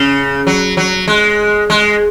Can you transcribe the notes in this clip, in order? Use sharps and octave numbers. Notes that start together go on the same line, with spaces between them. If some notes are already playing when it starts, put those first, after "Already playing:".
Already playing: C#3
F#3
F#3
G#3
G#3